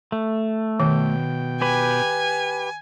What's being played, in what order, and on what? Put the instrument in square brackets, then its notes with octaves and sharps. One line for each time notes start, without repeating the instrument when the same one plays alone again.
[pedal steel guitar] A3
[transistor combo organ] B2 G5 [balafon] D#3
[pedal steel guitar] G4 B4 [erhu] G#5